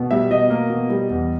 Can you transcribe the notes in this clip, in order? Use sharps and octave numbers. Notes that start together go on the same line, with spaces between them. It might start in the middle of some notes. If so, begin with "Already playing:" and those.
Already playing: B2
G3 E5
B2 D#5
A#3
B2
G3
E2